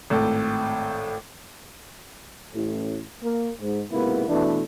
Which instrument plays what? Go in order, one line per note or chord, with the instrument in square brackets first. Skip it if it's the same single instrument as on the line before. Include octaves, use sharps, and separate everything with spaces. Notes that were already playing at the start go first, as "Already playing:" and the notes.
[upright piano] G#1 A2 A4
[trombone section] A1 A2
A#3
G#2
B1 G#2 C3 A#3 B3 E4
B2 E3 A3 D4